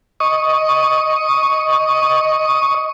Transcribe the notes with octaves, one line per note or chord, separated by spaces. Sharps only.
D#5 C#6 D#6